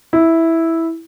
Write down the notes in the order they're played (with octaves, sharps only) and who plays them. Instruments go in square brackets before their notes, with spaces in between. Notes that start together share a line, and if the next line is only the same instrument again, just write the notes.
[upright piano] E4